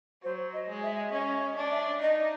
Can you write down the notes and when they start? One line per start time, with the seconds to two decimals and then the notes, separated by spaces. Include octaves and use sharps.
0.23 F#3 C5
0.53 D#5
0.68 G#3
0.83 E5
1.12 C#4 D#5
1.56 D4
1.71 E5
2.02 D#4 D#5